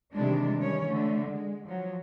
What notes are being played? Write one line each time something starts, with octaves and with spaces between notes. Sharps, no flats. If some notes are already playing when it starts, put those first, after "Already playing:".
C3 D#3 E3 G3 G#3 D4
D#3 E3 G3 C#4 C#5
D3 A3
G#3
F3 F#3